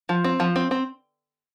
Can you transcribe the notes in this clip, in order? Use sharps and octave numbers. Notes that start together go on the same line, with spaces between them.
F3
C4
F3
C4
C4